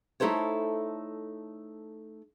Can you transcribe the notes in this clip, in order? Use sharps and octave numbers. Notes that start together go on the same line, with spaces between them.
A3 D#4 E4 A4 C5 C#5